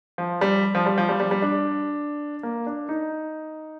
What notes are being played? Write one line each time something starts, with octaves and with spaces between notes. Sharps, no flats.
F3
G3
F3
G3
F3
G3
G3
G3
D4
A#3
D4
D#4